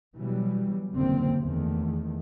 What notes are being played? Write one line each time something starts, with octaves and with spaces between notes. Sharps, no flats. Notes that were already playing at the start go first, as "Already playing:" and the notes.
B2 E3 F#3 G3
F#1 E2 D3 G3 A#3 C4
E2 D#3 A3